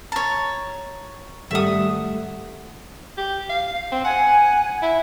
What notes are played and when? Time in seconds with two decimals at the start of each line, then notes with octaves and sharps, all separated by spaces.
0.12 C#5 A5 A#5
1.51 G#1 G3 A3 E5 F#5 D#6
3.17 G4
3.50 F5
3.92 C4
4.05 F#5 G#5
4.82 E4